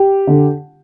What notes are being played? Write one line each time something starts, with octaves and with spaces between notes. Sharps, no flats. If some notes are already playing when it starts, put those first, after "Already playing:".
Already playing: G4
D3